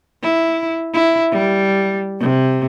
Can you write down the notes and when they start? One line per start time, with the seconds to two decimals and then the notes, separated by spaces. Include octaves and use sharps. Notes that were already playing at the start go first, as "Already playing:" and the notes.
0.23 E4
0.94 E4
1.31 G3
2.20 C3